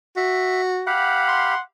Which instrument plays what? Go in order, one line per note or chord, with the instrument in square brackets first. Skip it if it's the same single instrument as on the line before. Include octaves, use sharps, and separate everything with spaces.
[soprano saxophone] F#4 [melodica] E5
[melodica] G4 F5 B5 [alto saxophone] F#5
[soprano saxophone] C6